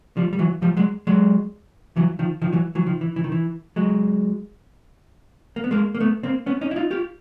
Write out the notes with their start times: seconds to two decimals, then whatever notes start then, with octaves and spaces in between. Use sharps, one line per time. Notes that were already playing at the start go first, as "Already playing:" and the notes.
0.17 F3 G3
0.33 G3
0.39 E3 F#3
0.62 F3 G3
0.77 F#3 G#3
1.07 F#3 G#3
1.96 E3 F#3
2.19 D#3 F3
2.42 D#3 F3
2.52 E3 F#3
2.75 E3 F#3
2.86 D#3 F3
3.01 E3
3.16 E3
3.24 D#3
3.32 E3
3.76 F#3 G#3
5.56 A#3
5.64 B3
5.71 G#3 A#3
5.95 A#3
6.00 A3 B3
6.23 A#3 C4
6.46 B3 C#4
6.61 C#4 D#4
6.71 E4
6.76 D#4 F4
6.90 F4 G4